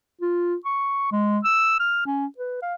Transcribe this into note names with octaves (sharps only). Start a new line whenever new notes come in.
F4
C#6
G#3
E6
F6
C#4
B4
F5